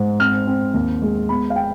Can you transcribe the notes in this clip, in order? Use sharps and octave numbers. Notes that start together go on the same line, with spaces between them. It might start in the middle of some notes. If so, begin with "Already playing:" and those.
Already playing: G#2
C4 F6
C4
D#2
G#3
B3 B5
F5
G5